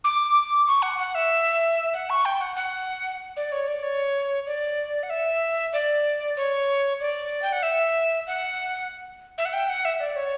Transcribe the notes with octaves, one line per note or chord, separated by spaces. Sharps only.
D6
C#6
F#5
F#5
E5
F#5
C#6
G5
F#5
F#5
D5
C#5
D5
C#5
D5
F#5
E5
D5
C#5
D5
G5
F#5
E5
F#5
E5
F#5
G5
F#5
E5
D5
C#5